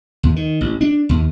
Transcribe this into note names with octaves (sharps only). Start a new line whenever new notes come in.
D#2
D#3
A1
D4
D#2